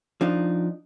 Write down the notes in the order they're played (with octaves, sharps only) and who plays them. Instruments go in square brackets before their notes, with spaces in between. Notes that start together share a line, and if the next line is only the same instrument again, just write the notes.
[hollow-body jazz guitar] F3 D4 D#4